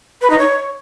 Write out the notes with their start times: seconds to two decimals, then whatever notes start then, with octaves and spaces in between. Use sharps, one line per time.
0.21 B4
0.30 D#4
0.39 C#5